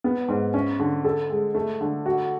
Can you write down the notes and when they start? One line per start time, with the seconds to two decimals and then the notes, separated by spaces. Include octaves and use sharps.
0.04 B3
0.28 G#2
0.54 C#4
0.80 D3
1.05 A4
1.30 G#3
1.55 A3
1.81 D3
2.06 F#4